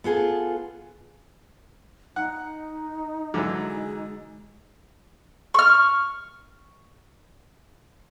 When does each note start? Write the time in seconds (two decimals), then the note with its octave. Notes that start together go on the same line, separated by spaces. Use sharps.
0.04 B3 F4 G#4 A4
2.16 D#4 F#5
3.34 D3 E3 F#3 G#3
5.54 C#6 F6